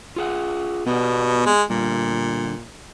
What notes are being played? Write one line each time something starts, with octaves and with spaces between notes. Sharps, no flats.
F4 G#4 F#5
B2 B3 G4 D5
G#3
A#2 D3 G3